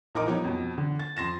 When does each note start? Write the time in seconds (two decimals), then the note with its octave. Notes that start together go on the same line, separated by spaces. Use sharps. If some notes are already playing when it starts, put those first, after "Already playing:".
0.15 A#1 D#4 A#4 D#5 D6
0.26 F3 G3 B3 D#4 G4 C#5
0.44 F2 B2
0.78 D3
0.99 A6
1.16 F2 C6 A#6 E7